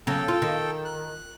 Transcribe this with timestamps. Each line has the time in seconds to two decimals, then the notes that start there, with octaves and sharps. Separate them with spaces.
0.07 C#3 F#3 A4 G5
0.28 F4
0.42 D#3
0.85 F#6